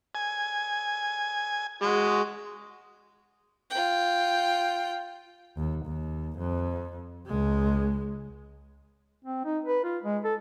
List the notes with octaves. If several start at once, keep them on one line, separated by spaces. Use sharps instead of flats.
G#5
G#3 F#4
F4 G5
D#2
D#2
F2
C#2 G#3
C4
D#4
B4
F4
G#3
A4